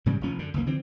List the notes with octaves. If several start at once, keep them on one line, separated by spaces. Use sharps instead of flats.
G#2 C#3 E3 G3
F1 D#2 F3 C#4
F#2 D3
F#1 C#2 E3 A#3
D3 E3 F3 C4